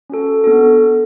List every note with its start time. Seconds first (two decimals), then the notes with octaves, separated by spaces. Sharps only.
0.10 C#4 F#4 A4
0.44 B3 D4 F#4 A4